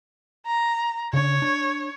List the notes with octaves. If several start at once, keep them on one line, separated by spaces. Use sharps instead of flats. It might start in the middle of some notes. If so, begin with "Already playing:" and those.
A#5
C#3 D4 C#5
D4